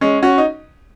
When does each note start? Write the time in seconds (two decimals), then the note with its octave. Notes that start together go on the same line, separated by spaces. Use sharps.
0.01 G#3 C#4
0.22 C#4 F#4
0.38 D#4